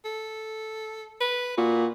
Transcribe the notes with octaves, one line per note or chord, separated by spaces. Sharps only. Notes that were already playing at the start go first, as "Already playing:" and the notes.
A4
B4
A#2 F#4